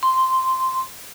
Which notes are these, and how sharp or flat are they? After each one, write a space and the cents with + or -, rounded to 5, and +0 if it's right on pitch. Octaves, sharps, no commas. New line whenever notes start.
C6 -5